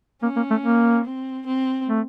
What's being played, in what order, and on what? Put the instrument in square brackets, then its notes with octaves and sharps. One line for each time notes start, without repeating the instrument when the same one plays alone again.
[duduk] A#3 [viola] C#4
[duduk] A#3
A3
A#3
[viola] C4
C4
[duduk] A3